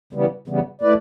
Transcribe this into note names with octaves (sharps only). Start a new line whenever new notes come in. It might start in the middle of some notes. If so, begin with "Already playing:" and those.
C#3 E3 G3 B3
C#3 E3 G3 B3
A3 E4 B4 D5